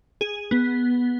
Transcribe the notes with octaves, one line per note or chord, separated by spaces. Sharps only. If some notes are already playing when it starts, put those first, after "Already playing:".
G#4
B3